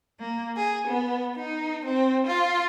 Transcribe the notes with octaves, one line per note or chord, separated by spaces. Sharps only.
A#3
G#4
B3
D#4
C4
F4